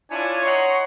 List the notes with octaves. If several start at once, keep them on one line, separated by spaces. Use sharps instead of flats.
D4 E4 F4 C#5 G#5
C#5 D#5 F#5 A#5 C6 C#6